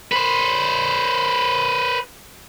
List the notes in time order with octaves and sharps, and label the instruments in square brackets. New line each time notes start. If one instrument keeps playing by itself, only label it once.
[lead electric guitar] B4 C5